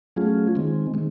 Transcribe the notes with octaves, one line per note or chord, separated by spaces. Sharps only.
F#3 A3 C#4 F4 G#4
D#3 G#3 C4
D#3 G#3